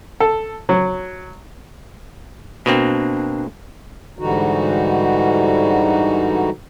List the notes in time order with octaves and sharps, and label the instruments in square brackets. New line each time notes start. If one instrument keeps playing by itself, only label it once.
[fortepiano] A4
F#3
[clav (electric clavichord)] B2 A#3 C4 [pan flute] D4
[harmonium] G#2 D3 E3 G3 D#4 F#4